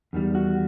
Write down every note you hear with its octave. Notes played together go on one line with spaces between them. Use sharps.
E2 D#3 G3
F#4